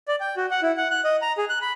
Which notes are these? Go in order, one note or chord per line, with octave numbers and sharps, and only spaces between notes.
D5
G5
F#4
F#5
E4
F#5
F#6
D#5
A#5
G#4
F#6
B5